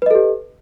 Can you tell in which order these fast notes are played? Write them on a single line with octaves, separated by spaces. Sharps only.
B4 D#5 A4 G4